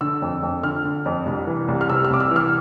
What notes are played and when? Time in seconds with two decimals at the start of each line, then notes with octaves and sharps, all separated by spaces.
0.01 D3 E6
0.22 F2
0.43 F2
0.63 D3 F6
0.84 D3
1.06 F2
1.26 C2
1.47 E3
1.68 C2
1.81 F6
1.89 C3 E6
2.04 F6
2.10 C2 D6
2.20 E6
2.31 E3
2.36 F6